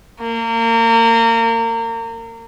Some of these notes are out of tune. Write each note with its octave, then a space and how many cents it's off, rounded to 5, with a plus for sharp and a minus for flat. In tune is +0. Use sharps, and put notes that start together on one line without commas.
A#3 -30